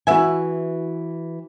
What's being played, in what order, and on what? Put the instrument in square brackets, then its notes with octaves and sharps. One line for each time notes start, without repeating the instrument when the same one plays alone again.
[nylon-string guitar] E3 F#4 [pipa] E4 E5 G#5